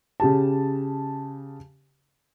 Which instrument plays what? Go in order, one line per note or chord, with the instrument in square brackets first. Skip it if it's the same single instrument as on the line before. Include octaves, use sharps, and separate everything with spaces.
[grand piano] C#3 G4 A5